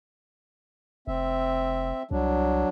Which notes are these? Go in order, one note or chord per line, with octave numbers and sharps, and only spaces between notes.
F1 C4 E5
C2 F#3 D4